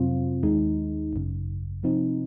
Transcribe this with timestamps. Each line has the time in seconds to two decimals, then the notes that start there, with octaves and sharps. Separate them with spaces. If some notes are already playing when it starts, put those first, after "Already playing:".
Already playing: F2 C3 F#3 C4 F4
0.43 D#2 D#3 G#3 D#4
1.13 G#1 F#2 C#3
1.83 C3 F3 C4 D#4